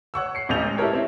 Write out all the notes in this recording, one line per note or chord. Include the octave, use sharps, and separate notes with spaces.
C#5 F#5 C#6 E6
C7 C#7
D#1 A1 C#4 D#5 G6 F7
G#3
E4 G4 A4 A#4 C#5
C4 E4